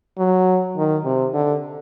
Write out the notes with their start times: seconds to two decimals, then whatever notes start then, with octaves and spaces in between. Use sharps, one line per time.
0.18 F#3
0.77 D#3
1.05 C3
1.34 D3